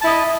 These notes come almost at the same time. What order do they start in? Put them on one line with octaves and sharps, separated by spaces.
A5 E4 D#5